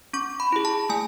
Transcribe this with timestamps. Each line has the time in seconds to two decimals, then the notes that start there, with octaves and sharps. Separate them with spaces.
0.13 C#4 C#6
0.40 B5
0.52 E4 G#4
0.65 A5
0.89 A3 G#5